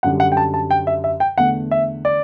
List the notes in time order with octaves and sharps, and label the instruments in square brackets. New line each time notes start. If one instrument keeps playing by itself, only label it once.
[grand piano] F#2 D3 G3 F#5
F#5
G5
A5
A5
G5
E5
E5
G5
E2 D3 A3 F#5
E5
D5